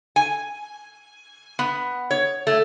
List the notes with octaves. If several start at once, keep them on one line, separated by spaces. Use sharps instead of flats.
G#5
B3
C#5
A3